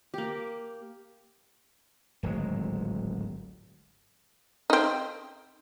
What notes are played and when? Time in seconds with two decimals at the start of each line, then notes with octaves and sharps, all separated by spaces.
0.14 A#3 G4
2.23 D1 G#1 F#3 G#3
4.70 C4 D#4